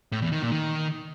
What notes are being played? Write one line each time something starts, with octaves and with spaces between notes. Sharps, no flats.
A2
E2
D#3
A#2
D#3